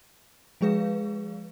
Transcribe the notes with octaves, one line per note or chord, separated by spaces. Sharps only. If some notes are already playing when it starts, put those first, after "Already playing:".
F3 G#3 G#4 B4 F5